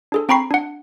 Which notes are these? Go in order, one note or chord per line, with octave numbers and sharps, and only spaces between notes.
D4 G#4 A4
C4 G5 A#5 B5 C#6 C7
D4 F#5